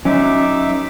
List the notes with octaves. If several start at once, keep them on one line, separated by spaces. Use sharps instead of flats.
F#3 C#4 D#4 E5 D6